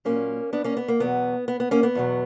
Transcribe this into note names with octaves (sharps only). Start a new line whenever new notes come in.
A#2 F#3 A#3 C#4
B3 D4
A#3 C#4
B3
A#3
E2 B2 F#3 B3
B3
B3
A#3 C#4
B3
E2 B2 F#3